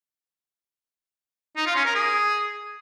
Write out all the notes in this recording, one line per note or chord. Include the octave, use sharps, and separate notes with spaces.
D#4
F4
C#4
A#4
G#4